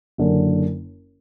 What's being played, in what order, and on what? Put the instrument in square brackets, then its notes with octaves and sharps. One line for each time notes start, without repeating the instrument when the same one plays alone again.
[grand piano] F#1 F#2 D3